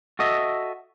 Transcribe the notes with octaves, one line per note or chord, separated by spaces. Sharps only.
F#4 A4 D#5 E5